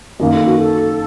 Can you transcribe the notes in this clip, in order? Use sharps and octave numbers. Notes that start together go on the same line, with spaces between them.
F#2 D#3 A#3 A#4
A4
F#4
A4